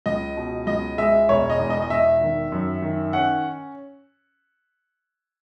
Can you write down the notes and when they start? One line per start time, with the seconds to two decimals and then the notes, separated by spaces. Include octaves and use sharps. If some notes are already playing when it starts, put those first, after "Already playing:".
0.06 C#2 D#5
0.37 B2
0.67 C#2 D#5
0.98 G#3 E5
1.29 E1 C#5
1.50 D#5
1.60 E2
1.70 D#5
1.82 D#5
1.90 E1 E5
2.21 D#3
2.52 F#2
2.82 D#3
3.13 C#4 F#5